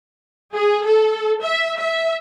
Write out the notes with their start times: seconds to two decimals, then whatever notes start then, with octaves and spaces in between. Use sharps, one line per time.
0.54 G#4
0.85 A4
1.42 E5
1.79 E5